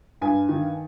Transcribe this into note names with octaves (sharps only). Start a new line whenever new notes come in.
G2 G#5
D#3